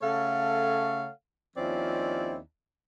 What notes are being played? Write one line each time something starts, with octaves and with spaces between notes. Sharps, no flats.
C#3 A3 A4 C#5 F5 F#5
D#2 F3 C4 C#4 E4 D5